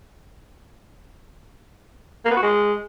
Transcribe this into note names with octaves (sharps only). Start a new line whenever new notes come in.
A#3
B3
F#4
G#3